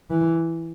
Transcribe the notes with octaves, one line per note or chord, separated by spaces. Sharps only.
E3